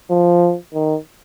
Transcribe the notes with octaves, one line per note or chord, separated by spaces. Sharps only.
F3
D#3